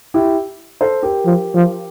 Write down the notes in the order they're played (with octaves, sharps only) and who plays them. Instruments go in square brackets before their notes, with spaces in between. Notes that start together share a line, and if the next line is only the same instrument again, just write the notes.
[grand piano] E4 G4
A4 C5
G4 A#4
[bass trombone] F3
F3